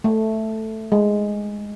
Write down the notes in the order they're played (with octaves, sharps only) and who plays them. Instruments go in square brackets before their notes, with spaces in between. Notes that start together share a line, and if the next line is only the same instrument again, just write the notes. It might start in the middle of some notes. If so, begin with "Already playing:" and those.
[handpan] A3
G#3